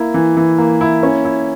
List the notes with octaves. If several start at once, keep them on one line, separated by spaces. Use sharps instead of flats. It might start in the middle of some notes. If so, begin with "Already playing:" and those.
Already playing: A#3 E4
E3
E3
A#3
E4
C#4
E4